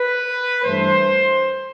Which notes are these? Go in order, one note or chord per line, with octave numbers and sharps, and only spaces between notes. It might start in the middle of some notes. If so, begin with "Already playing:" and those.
Already playing: B4
G2 E3 A3 C5